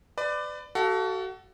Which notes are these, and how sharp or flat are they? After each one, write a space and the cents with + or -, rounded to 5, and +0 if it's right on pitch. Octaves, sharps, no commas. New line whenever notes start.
B4 +30 D5 +15
F#4 +30 A4 +0 F5 +0